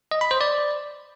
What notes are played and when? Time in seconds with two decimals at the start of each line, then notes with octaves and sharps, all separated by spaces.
0.11 D#5
0.21 B5
0.31 C5
0.41 D5